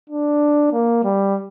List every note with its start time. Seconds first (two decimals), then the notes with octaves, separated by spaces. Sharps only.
0.10 D4
0.73 A#3
1.04 G3